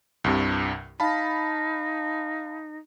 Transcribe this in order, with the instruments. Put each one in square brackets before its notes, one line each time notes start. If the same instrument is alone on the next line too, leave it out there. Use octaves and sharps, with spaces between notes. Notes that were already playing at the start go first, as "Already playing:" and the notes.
[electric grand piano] C2 G2 C3
[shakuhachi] D#4 [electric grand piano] F5 A5 B5